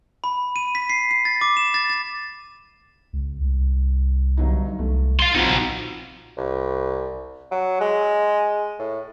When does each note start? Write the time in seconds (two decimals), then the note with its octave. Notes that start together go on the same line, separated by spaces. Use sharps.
0.24 B5
0.56 D#7
0.75 B6
0.90 C7
1.11 C7
1.25 A6
1.41 D6
1.57 E7
1.74 A6
1.90 A6
3.13 C#2
3.41 C2
4.37 G1 F#3 D#4
4.79 C2 A3
5.20 F5 C6
5.35 A#1 C4 D#4 F4 F#4 F5
6.38 C2
7.52 F#3
7.81 G#3
8.79 A2